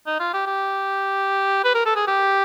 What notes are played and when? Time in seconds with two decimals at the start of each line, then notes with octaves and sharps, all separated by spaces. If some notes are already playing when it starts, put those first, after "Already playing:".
0.07 D#4
0.20 F4
0.33 G4
0.46 G4
1.64 B4
1.74 A#4
1.85 A4
1.96 G#4
2.07 G4